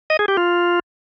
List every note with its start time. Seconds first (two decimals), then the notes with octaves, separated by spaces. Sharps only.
0.10 D#5
0.19 G#4
0.28 G4
0.37 F4